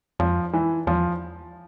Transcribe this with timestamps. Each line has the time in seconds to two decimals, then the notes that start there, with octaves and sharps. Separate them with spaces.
0.19 F2 F3
0.53 E3
0.87 E2 F3